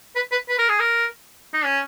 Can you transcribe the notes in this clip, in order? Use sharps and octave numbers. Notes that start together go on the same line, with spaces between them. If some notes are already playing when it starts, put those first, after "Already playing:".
B4
B4
B4
A#4
G#4
A#4
D#4
C#4